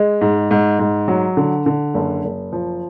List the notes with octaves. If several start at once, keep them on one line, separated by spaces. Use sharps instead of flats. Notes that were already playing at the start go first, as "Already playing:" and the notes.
Already playing: G#3
G#2
G#2
G#2
F#3
D3
D3
F#1
F#1
F3